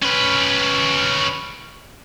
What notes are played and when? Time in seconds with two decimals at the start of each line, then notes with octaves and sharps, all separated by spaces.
0.03 C#4 B4